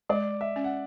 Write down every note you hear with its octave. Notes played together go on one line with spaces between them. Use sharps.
G#3 D5
E5
C#4
F#5